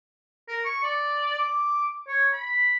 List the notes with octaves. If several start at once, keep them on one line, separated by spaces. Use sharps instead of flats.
A#4
C#6
D5
D6
C#5
B5